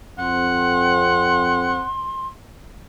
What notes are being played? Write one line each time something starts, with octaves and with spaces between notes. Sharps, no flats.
F2 C4 F#5 C6